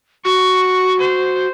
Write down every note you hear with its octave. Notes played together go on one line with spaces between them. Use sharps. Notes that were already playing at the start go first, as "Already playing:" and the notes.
F#4 C#6
C5